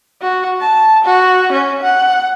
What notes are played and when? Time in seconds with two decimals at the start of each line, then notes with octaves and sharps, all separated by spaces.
0.22 F#4
0.61 A5
1.05 F#4
1.52 C#4
1.83 F#5